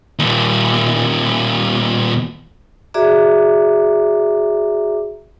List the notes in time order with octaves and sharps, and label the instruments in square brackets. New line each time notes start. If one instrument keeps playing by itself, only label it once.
[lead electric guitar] D#2 A#2
[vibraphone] F#4 G#4 D5 E5 A#5 D6